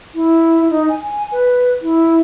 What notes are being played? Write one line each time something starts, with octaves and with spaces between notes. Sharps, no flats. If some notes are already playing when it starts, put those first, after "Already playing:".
E4
D#4
G#5
B4
E4